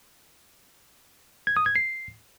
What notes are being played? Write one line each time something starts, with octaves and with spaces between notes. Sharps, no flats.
G#6
D#6
G#6
C7